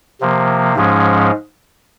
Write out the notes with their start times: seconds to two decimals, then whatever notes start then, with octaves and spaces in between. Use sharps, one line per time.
0.21 C3 F3 A#3
0.76 G#2 F3 G#3 C#4